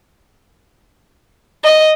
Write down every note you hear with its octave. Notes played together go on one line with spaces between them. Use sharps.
D#5